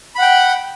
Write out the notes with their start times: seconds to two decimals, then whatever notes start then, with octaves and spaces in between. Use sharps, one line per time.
0.15 B5
0.18 F#5
0.22 G5